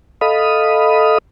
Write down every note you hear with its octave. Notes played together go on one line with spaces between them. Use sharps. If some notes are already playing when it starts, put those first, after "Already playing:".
A4 D#5 F5 B5 D#6